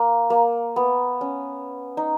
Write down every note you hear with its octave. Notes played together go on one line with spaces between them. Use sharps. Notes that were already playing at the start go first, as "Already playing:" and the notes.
Already playing: A#3
A#3
B3
C#4
D#4